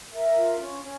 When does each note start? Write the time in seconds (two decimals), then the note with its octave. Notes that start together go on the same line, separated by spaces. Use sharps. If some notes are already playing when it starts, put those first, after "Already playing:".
0.12 A#4 E5
0.36 F4
0.60 C#4
0.83 C#4